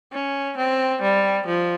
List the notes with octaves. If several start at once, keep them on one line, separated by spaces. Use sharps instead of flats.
C#4
C4
G3
F3